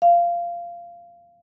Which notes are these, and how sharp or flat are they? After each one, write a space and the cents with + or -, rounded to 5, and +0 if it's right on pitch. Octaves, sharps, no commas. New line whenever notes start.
F5 -15